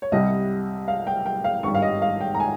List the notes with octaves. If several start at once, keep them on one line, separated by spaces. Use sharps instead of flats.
C#5
C2 C3 G3 D#5
F5
G5
G5
F5
G#1 G2 D#3 G3 C#6
F5
D#5
F5
G5
A#5
G#5